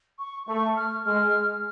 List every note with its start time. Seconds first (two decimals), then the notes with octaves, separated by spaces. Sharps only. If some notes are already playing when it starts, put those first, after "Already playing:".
0.19 C#6
0.48 A3 C#6
0.77 F6
1.06 G#3 F6